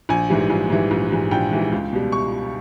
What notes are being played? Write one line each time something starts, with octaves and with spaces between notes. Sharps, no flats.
A#1 G#5
G#2 E3 G3
A#1
G#2 E3 G3
A#1
G#2 E3 G3
A#1 G5
G#2 E3 G3
C#2
B2 G3
C#6